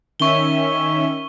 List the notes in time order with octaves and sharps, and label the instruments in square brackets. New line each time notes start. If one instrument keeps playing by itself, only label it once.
[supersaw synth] D#3 C#4 E5 [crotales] C#6 G7